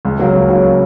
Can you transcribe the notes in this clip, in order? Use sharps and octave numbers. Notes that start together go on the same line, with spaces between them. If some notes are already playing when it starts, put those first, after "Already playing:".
C#2
C#3 F#3 A#3
C#2
C#3 F#3 A#3